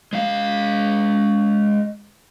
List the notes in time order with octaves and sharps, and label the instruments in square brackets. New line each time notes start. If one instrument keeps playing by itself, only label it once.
[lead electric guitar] G#3 F5